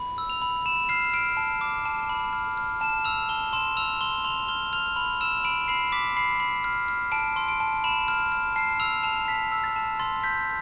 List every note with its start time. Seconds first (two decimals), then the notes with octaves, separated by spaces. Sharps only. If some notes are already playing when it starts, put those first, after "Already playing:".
Already playing: B5
0.18 E6
0.30 F7
0.42 B5
0.66 B5 E7
0.89 F6 C7
1.14 F6 D7
1.37 A5
1.61 D6
1.86 A5
2.09 B5
2.33 F6
2.58 F6
2.81 A5 E7
3.04 E6 F7
3.29 A5 G7
3.53 C6 E7
3.77 E6 F7
4.01 C6 G7
4.25 C6 F7
4.48 F6 G7
4.73 F6 F7
4.96 B5 F7
5.21 E6 E7
5.44 B5 D7
5.68 B5 C7
5.92 D6 B6
6.16 B5 C7
6.40 B5
6.64 F6
6.88 F6
7.12 A5 D7
7.36 C6
7.49 D7
7.60 A5
7.84 B5 E7
8.08 F6
8.32 F6
8.56 A5 C7
8.80 E6 F7
9.03 A5 F7
9.28 A5 B6
9.52 E6
9.64 A6
9.76 A5
9.99 C6 A6
10.23 G6 B6